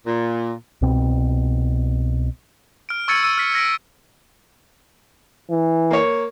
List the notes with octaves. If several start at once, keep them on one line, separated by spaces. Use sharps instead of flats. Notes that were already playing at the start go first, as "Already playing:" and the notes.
A#2
C2 B2 C4
F6 D7
C#6 E6 G#6 A6 C#7 D#7
E6 D#7
F6 B6
G#6 A#6 B6 D7
E3
A#3 C#5